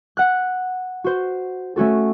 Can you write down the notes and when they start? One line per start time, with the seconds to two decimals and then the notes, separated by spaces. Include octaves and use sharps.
0.17 F#5 F#6
1.04 F#4 C5
1.76 A3 C#4 F#4 A4